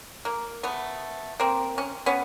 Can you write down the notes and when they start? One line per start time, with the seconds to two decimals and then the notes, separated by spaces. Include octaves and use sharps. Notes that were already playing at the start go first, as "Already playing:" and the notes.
0.25 A#3
0.63 A3 B3
1.40 A#3 C4
1.78 C#4
2.06 B3 C#4